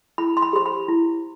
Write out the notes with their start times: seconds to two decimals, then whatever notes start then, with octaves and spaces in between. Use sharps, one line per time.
0.18 E4 B5
0.37 C6
0.42 B5
0.53 G4 C5 C6
0.66 B5
0.88 E4